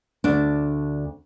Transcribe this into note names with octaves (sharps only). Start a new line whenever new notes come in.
D2 D4